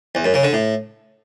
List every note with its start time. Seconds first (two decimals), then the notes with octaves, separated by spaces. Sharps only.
0.15 E2
0.24 F#2
0.34 C#3
0.44 D3
0.53 A2